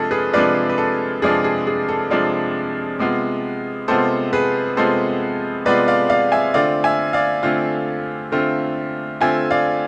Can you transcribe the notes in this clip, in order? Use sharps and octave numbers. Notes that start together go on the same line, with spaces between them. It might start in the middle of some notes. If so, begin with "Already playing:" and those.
Already playing: C3 F3 G#3 D4 F4 G#4 A4
G#4 B4
C3 F3 G#3 D4 F4 B4 D5
B4
A4
C3 F3 G#3 D4 F4 G#4
G#4
G#4
A4
C3 F3 G#3 D4 F4
C3 G#3 B3 F4
C3 G#3 B3 F4 A4 C5
G#4 B4
C3 G#3 B3 F4 A4 C5
C3 G#3 B3 F4 B4 D5
D5 F5
D5 F5
E5 G#5
D3 A3 C4 F4 D5 F5
E5 G#5
D5 F5
D3 A3 C4 F4
D3 A3 C4 F4
D3 A3 C4 F4 E5 G#5
D5 F5